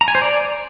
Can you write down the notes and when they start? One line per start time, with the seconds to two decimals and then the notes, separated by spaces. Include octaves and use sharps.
0.01 A#5
0.08 G#5
0.15 C5
0.22 D5